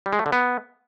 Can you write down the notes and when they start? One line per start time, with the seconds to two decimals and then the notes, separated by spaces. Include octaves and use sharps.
0.06 G3
0.13 G#3
0.19 A3
0.26 D3
0.32 B3